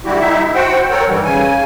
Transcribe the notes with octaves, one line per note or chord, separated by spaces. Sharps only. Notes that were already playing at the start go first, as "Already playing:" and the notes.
D3 G3 E4 F#4 G4
D#4 E4 E5
F#4 C5 F#5 G5
A4 A#4 C#5 F#5 G5
G2 D#3 E3 G3
C#3 G#5